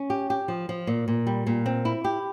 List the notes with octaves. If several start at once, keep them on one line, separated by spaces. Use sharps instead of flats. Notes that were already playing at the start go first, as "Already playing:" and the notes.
Already playing: C#4
G4
G4
F3
F3
A#2
A#2
G3
A#2
C4
E4
G4